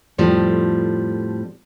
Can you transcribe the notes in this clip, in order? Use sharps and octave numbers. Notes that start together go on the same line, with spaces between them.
F2 A2 F3 G3